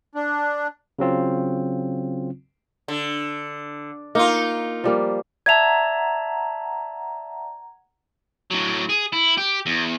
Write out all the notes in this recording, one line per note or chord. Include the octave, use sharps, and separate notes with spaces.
D4
C#3 F#3 C4 F4
D3
A#3 D#4 F4
F3 G3 A#3
D5 E5 F#5 A5 A#5 G#6 F7
A2 F#3
G#4
E4
G4
E2